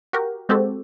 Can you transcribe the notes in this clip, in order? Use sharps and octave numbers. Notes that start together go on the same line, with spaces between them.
F#4 G4 A#4
G#3 C4 F#4 G4 A4